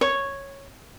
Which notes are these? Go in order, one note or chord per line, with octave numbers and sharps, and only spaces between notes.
C#5